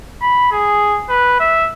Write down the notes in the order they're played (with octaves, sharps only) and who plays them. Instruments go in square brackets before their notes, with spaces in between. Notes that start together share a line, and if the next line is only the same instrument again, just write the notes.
[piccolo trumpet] B5
G#4
B4
E5